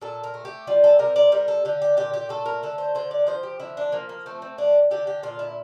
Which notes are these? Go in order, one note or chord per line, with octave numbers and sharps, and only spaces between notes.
A#2 A4
A#4
A3
G4
G3 F4
A4
C3 A#4
D5
G3 A#4
A4
D3 G4
G4
A#2 G4
G4
A3 A4
A#4
D3 A4
C5
D3 C5
D5
F3 C5
G4
D3 E4
D4
F3 A#3
A#3
A3 C4
C4
D3 D4
D3 G4
G4
A#2 F4
E4